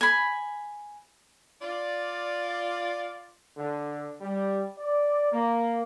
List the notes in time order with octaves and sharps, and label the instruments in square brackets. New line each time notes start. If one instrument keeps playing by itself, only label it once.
[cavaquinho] G#5 B5
[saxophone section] F4 D5
[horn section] D3
G3
D5
A#3